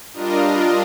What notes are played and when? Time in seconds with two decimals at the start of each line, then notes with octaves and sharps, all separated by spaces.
0.13 G3 D4 F4 A#4 D#5